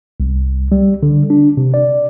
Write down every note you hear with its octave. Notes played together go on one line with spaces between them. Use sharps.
C2
G3
D3
D4
C3
D5